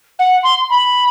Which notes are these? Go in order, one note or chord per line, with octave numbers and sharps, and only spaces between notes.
F#5
C6
B5